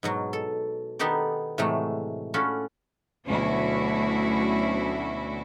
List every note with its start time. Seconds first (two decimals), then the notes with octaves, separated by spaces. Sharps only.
0.03 G#2 B2 F#3
0.33 A4
0.99 D#3 B3 D#4 G4 A4 D5
1.58 A2 C3 E3 F#3 G#3 A3
2.34 C#4 F4 F#4 A4 D5 B5
3.27 D2 B2 F#3 C#4 E4 F#4